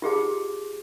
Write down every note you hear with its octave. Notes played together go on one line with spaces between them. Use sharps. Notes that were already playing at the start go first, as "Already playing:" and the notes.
F4 G4 G#4 A5